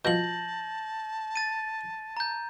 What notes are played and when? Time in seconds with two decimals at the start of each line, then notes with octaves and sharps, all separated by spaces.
0.05 B2 F3 A5 G6 A#6 F#7
1.36 A6 D#7
2.17 A#5 G6